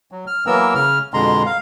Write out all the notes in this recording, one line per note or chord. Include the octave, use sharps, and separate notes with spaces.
F#3
F6
E3 F#3 A#3 B3 A#4 E6
C#3 F6
F2 B2 D3 G#3 A#5 C6
F5